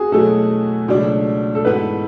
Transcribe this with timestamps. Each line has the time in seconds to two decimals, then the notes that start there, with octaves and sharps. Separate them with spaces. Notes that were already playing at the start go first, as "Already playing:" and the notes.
Already playing: F#4 G#4
0.12 B2 F#3 A3 E4 A4
0.88 C#2 B2 F#3 A3 D4
1.55 A4
1.65 G#2 E3 B3 E4 B4